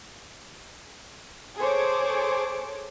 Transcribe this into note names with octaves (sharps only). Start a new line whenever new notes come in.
G#4 A4 C5 C#5 D6